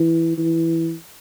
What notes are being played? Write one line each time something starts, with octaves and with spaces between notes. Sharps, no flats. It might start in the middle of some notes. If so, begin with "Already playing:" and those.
Already playing: E3
E3